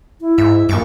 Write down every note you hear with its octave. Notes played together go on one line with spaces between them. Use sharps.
E4
G#2 E5
A#1 G2 C#6 D6